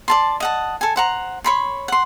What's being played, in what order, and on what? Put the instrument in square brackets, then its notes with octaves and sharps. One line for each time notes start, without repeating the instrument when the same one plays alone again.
[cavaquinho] D5 A5 C6
D#5 F#5 A5
A4 G#5
C5 F#5 A#5
C#5 B5 C6
F#5 C6